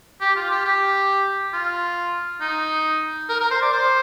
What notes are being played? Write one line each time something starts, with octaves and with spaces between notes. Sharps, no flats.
G4
F4
G4
G4
F4
D#4
A#4
A#4
C5
D5
C5